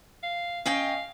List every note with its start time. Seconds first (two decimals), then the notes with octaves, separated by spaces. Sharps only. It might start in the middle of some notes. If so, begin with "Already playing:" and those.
0.23 F5
0.66 C#4 D#5 F5 G5